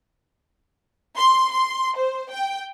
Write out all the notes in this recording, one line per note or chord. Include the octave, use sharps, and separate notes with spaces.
C6
C6
C5
G5